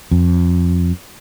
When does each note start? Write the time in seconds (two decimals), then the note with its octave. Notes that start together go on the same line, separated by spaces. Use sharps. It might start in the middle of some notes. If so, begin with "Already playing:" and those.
0.11 F2